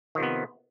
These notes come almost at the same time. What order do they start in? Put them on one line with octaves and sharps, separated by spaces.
D#3 F3 C3 B3